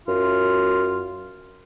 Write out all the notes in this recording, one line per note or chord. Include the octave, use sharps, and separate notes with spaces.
F#2 F4